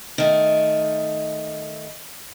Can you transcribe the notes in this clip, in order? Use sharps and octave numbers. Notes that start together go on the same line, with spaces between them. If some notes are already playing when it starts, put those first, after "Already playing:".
D#3 A3